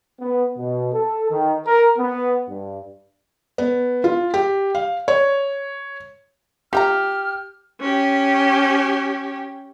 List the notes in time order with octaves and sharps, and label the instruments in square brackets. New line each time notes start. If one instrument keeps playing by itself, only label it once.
[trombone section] B3
B2
A4
D#3
A#4
B3
G2
[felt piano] B3
F4
G4
F5
C#5
[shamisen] F4 E5 A#5 [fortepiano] G4 [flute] F6
[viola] C#4 G4